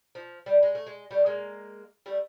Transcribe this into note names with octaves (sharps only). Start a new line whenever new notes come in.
F3
G3
G#3
A3
G#3
G3 A3
G#3 A#3
G3 A3